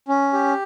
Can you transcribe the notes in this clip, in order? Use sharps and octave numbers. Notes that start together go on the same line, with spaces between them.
C#4
G4